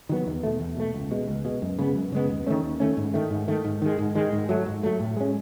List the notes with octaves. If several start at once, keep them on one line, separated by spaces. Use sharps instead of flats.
D#3 F#3 B3
E2
B2 A3
E2
B2 A3
C#2
B2 G#3
C#2
B2 G#3
F#2
C#3 G#3 B3
F#2
C#3 G#3 B3
D#2
D#3 A3 C#4
D#2
D#3 A3 C#4
G#2
D#3 A3
G#2
D#3 A3
G#2
D#3 G#3
G#2
D#3 G#3
G#2
F#3 A3
G#2
F#3 A3
A2
G#3 C#4